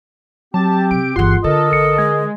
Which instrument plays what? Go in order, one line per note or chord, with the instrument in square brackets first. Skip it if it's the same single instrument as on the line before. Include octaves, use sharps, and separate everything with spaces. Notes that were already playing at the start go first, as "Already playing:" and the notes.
[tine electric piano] F#3 [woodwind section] C4 G4 [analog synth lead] A5
[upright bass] C3 [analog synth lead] D7
[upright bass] G1 E3 [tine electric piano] F4 [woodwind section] G4 G#4 F#5 [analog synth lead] C6
[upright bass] D3 [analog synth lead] A4 [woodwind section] A#4 D#5
[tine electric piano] A1 C#7
[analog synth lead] G#3 [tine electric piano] G#6